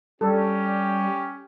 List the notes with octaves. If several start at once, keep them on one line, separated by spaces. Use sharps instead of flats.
G3 C#4 G4 A4